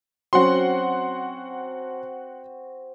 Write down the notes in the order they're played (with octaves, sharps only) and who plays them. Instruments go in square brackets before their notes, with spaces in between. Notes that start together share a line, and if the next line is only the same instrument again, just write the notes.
[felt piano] F#3 C#4 [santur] C4 F#4 [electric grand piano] F#5 C6